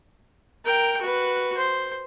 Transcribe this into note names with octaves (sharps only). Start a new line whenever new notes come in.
A#4 G5
F#4 B4
C5